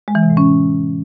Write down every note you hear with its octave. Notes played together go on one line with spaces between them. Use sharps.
G#3
E3
C3
A2
C#4